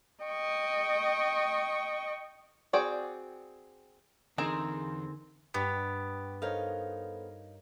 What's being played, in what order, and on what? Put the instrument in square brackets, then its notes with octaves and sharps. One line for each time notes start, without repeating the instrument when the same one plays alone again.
[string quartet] D#5 G5 C#6
[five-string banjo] C4 F#4 G#4 D5 G5
[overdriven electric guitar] E2 [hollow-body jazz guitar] D3 D#4 [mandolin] C4 [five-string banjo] G#4 A#4
[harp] G2 [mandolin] B3 [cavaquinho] G4
[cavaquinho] D#4 F5 [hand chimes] A4 C5 [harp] A#4 C#5